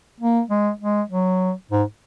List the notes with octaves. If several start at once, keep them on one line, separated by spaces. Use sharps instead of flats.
A#3
G#3
G#3
F#3
G#2